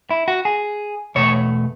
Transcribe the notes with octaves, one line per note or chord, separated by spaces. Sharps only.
E4
F#4
G#4
E2 B2 A3 C#5